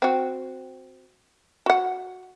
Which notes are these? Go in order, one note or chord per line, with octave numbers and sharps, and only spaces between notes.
C4 F#4
F#4 F#5